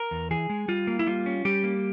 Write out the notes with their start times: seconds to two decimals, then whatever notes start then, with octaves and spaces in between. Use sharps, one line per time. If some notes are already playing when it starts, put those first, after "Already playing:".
Already playing: A#4
0.11 E2
0.31 E3 G#4
0.50 G#3
0.68 G3 F4
0.87 A#3
0.99 E4
1.07 G3 F4
1.26 C#4
1.45 G3 G4
1.64 A#3